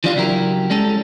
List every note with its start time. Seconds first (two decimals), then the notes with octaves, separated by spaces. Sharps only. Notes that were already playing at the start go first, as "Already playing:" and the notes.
0.04 E3 F3 G3 D4 F4
0.16 C#3 F#3 E4 G4 A#4
0.70 G3 G#3 C#4 A4